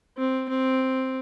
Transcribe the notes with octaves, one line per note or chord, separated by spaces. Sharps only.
C4
C4